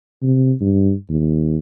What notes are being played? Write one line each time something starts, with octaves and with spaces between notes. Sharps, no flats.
C3
G2
D#2